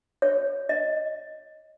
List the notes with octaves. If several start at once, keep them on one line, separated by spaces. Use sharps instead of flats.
C#5
D#5